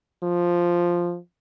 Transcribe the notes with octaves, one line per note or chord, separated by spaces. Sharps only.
F3